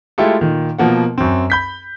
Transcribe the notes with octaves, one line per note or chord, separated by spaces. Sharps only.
G#3 A3 E4 F4 G4 A4
A#2 D#3
B2 F3 A#3 F#5
F#2 C4
B5 G6 B6